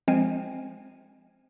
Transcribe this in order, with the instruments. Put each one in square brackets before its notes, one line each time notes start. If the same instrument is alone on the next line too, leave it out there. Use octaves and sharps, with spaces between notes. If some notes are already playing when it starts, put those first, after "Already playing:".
[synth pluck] F3 G#3 C4 G#5